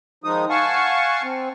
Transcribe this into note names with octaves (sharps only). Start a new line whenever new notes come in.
D#3 F3 G#3 D#4 D#6
F5 F#5 G#5 A5 C#6
C4